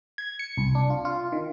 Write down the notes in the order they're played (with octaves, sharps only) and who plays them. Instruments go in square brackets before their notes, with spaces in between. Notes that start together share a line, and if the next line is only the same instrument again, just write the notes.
[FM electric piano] G#6
C#7
C2
D4
F4
F4
D#3